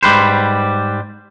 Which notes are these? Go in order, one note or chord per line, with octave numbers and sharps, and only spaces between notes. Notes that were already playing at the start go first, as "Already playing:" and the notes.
G#2 G3 B4 C5